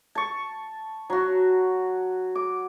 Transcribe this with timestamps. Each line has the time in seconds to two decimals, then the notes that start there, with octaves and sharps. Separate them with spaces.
0.15 A5 C#6
1.10 F#3 F#4
2.35 D6